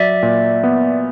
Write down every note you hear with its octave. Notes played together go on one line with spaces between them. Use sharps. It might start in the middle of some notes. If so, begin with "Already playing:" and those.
Already playing: F#3 D5 E5
A#2
B3